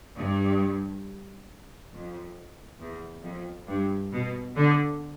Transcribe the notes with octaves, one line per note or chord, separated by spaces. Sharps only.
G2
F2
E2
F2
G2
B2
D3